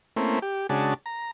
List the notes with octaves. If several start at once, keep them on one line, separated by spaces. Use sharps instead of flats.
A3 A#3 C4 C#4 E4
G4
C#3 G#3 D4 F#4 A5
A#5